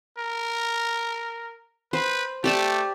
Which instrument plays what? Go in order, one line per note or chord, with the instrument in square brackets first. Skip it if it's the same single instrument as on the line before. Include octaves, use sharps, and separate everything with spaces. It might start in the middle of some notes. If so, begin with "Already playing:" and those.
[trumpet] A#4
[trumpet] B4 [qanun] C5
[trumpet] A3 [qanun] G4 D5 A5